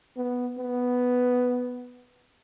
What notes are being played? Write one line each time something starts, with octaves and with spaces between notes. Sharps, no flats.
B3
B3